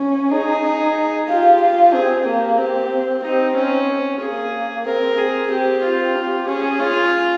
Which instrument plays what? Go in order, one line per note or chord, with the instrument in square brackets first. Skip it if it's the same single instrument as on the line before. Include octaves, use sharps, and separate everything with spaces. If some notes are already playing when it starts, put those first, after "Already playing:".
Already playing: [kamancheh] C#4
[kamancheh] D#4 [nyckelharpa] G#4
[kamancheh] F4 [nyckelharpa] G4
[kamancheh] F4
[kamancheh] C4 [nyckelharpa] G#4
[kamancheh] A#3 [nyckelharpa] G4
[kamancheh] C4 [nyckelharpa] G4
[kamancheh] C4 [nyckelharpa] D#4
[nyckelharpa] C#4
[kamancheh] A#3 [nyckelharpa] G#4
[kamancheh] C4 [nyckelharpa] A#4
[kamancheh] C4 [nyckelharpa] G#4
[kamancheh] C4 [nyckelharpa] G4
[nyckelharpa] F4
[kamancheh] G4
[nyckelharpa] C#4 [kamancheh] G#4
[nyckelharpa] F4 [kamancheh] G#4